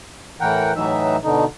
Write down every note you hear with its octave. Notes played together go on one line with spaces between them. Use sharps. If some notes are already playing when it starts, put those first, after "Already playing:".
A2 E3 A#4 F#5 G5
A2 E3 F#3 D#4 E5
B2 D3 D#4